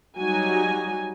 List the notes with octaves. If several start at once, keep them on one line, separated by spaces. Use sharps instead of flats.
F#3 G3 D#4 F#4 G#5